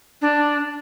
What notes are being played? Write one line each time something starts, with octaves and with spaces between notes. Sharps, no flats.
D4